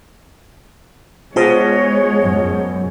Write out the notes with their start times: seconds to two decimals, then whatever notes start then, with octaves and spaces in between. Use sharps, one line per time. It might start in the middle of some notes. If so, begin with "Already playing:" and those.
1.36 B2 G#3 F4 G#4 C5 C#5
2.23 F#2